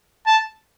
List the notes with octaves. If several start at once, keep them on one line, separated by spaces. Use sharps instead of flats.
A5